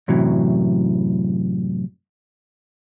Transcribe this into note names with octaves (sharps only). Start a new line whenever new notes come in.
F#2 A2 C3 E3 F#3